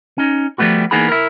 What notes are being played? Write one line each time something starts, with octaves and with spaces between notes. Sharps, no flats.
C#4 D#4
F3 G3 A3 B3 F#4
E3 A#3 B3 D#4 G#4 B5
E4 A#4